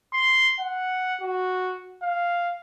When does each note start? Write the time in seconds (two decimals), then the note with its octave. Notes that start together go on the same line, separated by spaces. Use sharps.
0.13 C6
0.59 F#5
1.21 F#4
2.02 F5